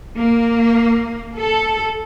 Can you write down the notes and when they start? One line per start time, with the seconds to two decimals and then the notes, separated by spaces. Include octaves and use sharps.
0.17 A#3
1.36 A4